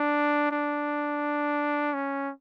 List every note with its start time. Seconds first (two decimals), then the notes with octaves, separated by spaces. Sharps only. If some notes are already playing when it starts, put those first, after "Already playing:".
Already playing: D4
0.51 D4
1.94 C#4